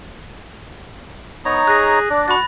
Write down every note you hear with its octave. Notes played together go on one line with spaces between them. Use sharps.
B3 D#4 C#5 A#5
G#4 F#6 A#6
D4 D5
F#4 B5 A6